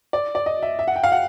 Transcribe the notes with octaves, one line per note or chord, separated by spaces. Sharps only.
D5
D5
D#5
E5
E5
F#5
G5
F5
F#5